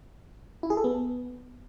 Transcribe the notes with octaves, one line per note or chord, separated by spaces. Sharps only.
E4
G#4
A4
B3